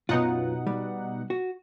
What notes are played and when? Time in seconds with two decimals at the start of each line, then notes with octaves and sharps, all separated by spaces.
0.09 B1 F#2 B2 D#4 F4 F#5
0.67 G3
1.30 F#4